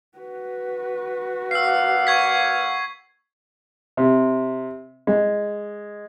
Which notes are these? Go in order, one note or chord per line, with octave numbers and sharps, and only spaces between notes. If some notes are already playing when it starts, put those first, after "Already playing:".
F#4 B4
A#3 D5 F5 F#5 E6 C7
C#6 G#6 B6
C3
G#3